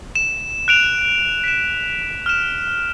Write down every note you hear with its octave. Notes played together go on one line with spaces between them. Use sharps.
E7
F#6 D7 F7
B6 E7
F6 E7